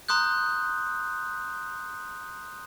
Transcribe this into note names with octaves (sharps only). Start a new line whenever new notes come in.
A#5 C6 D#6 F#6 G6